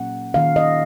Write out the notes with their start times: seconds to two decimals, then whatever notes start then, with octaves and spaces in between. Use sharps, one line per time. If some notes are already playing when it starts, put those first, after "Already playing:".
Already playing: A#2 F#3 A#3 C#4 F#5
0.34 D#3 A#3 C#4 F5
0.56 D#5